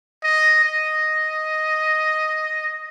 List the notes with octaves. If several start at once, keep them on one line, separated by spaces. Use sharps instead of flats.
D#5
D#5